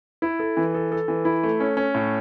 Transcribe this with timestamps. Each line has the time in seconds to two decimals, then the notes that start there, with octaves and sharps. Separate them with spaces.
0.22 E4
0.39 A4
0.57 E3
0.74 A4
0.92 A4
1.08 E3
1.25 E4
1.43 A3
1.60 C#4
1.77 C#4
1.95 A2